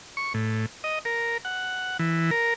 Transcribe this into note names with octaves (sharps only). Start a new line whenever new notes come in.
C#6
A2
D#5
A#4
F#5
E3
A#4